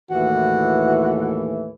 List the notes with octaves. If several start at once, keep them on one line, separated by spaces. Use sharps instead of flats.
D#2 A2 E3 F#4